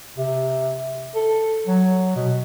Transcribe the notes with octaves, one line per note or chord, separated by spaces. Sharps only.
C3
A4
F#3
B2